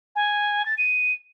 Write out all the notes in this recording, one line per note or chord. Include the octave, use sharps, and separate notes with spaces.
G#5
A6
D#7